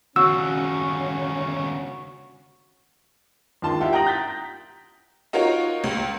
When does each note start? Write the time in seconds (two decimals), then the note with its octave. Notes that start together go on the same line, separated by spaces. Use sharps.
0.16 D#2 C#3 C#4 F#4 E6
3.62 D#2 G#2 D#3 F4 A5 C6
3.80 E4 F4 G4 F#5
3.93 G5 A#5 D#6 A#6 F#7
4.07 G6 A6 B6
5.33 D#4 F4 F#4 A#4 C#5
5.84 C#2